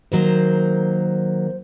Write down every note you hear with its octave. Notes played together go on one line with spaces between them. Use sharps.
D#3 F#3 A#3 C5